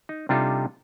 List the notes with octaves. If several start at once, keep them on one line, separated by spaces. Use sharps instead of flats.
D#4
C3 G3 D4 D#4 F4 A4